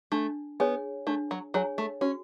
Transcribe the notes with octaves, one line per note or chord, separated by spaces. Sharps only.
A3 D4
B3 G#4 C#5 G#5
A3 D4
F#3
F#3 G#4 C#5 G#5
A3
C#4 F#4